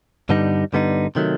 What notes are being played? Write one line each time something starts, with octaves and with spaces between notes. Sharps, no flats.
G2 D3 G3 B3 D#4
G2 D3 G3 B3 D#4
C3 D#3 F#3 A3